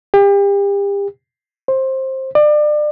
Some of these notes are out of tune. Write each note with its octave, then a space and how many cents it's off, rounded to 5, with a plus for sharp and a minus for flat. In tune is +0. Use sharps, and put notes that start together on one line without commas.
G4 +35
C5 +15
D5 +30